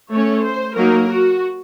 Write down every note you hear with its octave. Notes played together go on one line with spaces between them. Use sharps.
A3 C#4 C#5
C5
F#3 A#3 D#4 A#4
F#4